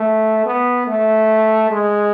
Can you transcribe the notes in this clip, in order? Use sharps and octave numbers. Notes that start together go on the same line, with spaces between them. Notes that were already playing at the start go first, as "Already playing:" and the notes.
Already playing: A3
B3
A3
G#3